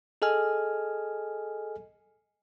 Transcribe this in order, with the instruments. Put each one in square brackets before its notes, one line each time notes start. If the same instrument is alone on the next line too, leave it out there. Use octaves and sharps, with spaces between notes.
[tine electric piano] G#4 A4 D#5 G#5 F6